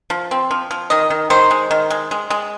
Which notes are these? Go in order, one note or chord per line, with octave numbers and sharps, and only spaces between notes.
F3
C4
F3
F3
D#3 D#5
D#3
D#3 C5
G#3
D#3
G#3
G#3
G#3